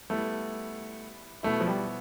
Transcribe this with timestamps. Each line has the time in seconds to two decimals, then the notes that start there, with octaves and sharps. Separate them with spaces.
0.10 G3 A3 B3 E4
1.43 B2 A3 B3 E4
1.61 F3
1.67 G3